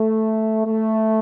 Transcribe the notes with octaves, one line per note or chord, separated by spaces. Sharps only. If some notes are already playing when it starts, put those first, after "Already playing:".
Already playing: A3
A3